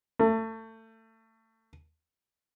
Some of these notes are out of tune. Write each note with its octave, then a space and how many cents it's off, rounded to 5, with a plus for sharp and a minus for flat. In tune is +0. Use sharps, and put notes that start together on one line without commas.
A3 +25